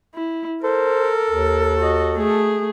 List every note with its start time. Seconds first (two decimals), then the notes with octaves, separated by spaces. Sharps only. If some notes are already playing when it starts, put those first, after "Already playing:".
0.14 E4
0.64 A4 A#4 C5
1.30 D#2
1.79 F#4 D#5
2.16 A3 G#4